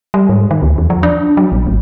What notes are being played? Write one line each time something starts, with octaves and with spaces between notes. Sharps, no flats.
G3
G#2
D#3
D2
E2
F3
D4
F#3
A#1
G#1